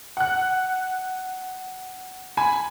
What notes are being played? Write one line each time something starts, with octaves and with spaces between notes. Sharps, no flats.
F#5 F#6
G#5 B5